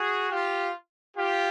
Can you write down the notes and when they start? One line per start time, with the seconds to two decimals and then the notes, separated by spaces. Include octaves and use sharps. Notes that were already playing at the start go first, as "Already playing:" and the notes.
Already playing: F#4 G#4
0.31 F4 G4
1.17 F4 G4